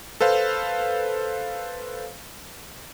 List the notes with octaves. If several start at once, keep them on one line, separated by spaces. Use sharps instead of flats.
A4 B4 C5 F5